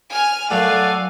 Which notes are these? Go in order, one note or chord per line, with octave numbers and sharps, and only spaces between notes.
G#5 F6
F#2 A2 A4 D5 F5 F#5 G#5